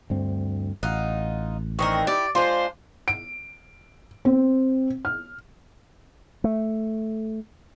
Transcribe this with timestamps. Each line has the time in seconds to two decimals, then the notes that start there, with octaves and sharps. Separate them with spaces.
0.10 D2 G2 C4
0.83 A1 D#4 F4 F#5
1.79 D#3 E3 C4 D4 D#4 A#4 C#6
2.07 E4 G4 D5
2.35 G#3 D4 F4 C5 C6
3.08 D7
4.25 C4
5.05 F6
6.44 A3